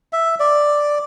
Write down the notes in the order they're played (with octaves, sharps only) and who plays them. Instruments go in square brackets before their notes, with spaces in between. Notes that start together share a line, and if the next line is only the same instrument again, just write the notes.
[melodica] E5
D5